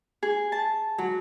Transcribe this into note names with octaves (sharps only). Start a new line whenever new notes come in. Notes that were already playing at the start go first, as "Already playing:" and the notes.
G#4
A5
F#3